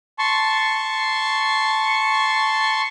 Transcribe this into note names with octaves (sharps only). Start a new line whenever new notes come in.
A5 C6 C#6